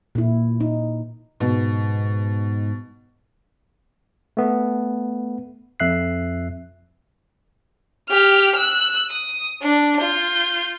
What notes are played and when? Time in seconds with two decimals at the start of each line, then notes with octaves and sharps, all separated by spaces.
0.15 A#2 E4
0.60 D#4
1.40 G#2 B2
4.37 A3 B3
5.80 F2 E5 F#6 C7
8.09 G4 F6
8.56 E6 F#6
9.10 D#6
9.62 D4
10.01 F4 G6